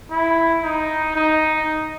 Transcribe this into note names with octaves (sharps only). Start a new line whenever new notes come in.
E4
D#4
D#4